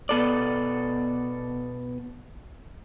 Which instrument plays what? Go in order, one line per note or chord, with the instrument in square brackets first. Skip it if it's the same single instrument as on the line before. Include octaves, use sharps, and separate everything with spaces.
[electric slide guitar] B2 B3 A4 D5